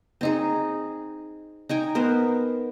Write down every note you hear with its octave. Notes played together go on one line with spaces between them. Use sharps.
C4 D#4 G#4
D#4 G5 G#5
B3 A#4 C5